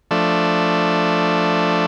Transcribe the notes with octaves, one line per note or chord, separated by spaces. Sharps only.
F3 A3 D4